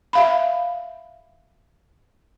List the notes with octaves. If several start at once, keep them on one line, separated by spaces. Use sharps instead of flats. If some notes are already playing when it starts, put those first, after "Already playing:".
E5 F5 B5